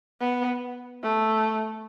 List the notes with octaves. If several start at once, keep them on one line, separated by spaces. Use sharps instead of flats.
B3
A3